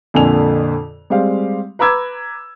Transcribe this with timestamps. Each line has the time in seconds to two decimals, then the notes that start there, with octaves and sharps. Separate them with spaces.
0.14 F2 A#2 D3 A4 G#5 F7
1.10 G3 G#3 C4 G4 F5
1.79 B4 A#5 B5 D6 E6 G#6